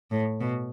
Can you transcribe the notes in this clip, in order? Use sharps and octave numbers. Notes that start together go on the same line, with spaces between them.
A2
B2